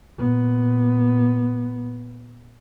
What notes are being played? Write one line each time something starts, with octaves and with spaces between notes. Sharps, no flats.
A#2 B3